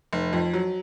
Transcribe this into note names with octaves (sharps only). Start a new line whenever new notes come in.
F1
F2
F#3